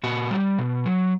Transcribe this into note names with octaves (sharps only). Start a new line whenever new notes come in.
A#2 F#4
G3
B2
F#3